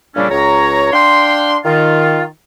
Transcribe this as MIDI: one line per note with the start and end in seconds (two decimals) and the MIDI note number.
0.16 0.28 46
0.16 0.28 49
0.16 0.28 55
0.16 0.28 57
0.16 0.28 61
0.16 0.28 62
0.30 0.92 37
0.30 0.92 73
0.30 0.92 82
0.93 1.58 62
0.93 1.58 77
0.93 1.58 79
0.93 1.58 84
1.65 2.25 51
1.65 2.25 65